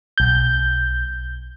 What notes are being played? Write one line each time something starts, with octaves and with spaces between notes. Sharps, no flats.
B1 G6